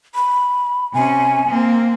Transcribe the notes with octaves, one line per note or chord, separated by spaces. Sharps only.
B5
C3 C#4 G#5
A#3 C4